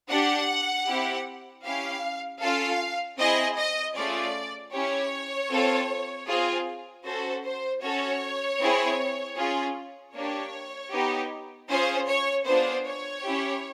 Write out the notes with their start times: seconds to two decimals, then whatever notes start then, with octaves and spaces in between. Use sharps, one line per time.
0.09 D4 G4 F#5
0.86 C4 E4 G4
1.63 C#4 E4 G4 F5
2.41 C#4 F4 A4 F5
3.18 C4 E4 G#4 D#5
3.57 D#5
3.95 A3 C#4 F4 G#4 D5
4.73 C#4 E4 G4 C#5
5.50 C4 F4 A4
6.27 C4 F4 G#4
7.04 C#4 F#4 A4 C5
7.44 C5
7.82 C#4 F#4 A4 C#5
8.60 C4 E4 G#4
9.37 C#4 F4 G#4
10.14 A#3 D4 G4 C#5
10.91 B3 D#4 G4
11.69 C#4 F4 G#4 C5
12.08 C#5
12.46 B3 D4 F4 G#4 C5
12.85 C#5
13.24 C#4 E4 G4